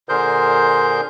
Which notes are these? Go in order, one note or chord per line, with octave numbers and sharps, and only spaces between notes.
A#2 D3 G#4 A#4 C5 G6